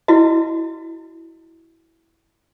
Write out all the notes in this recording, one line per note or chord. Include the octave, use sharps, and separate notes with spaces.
E4 F#4 D#5